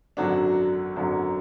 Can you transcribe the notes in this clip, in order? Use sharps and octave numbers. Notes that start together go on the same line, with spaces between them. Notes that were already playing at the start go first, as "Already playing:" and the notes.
G#1 F#2 D3 F#3 D4 F#4
G#1 F#2 D3 F#3